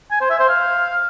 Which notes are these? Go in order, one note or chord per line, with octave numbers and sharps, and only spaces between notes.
G#5
C5
E5
C5
F5